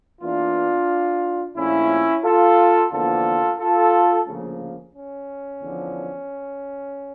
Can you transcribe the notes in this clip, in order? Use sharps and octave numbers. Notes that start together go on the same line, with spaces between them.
E2 E3 A#3 D4 F4
A#1 A#2 A3 C#4 E4
F4 A4
E2 D3 F3 A#3 F4 A4
F4 A4
D2 C#3 F3 A#3
C#4
E2 D3 F3